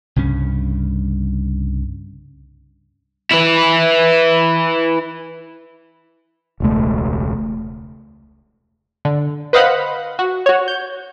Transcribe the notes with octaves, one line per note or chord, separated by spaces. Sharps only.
C2 G2 C#3 C#4
E4 B4
E1 C#2 A3
D3
B4 C5 D#5 F5 F#5 B5
F#4
F#4 C#5
G6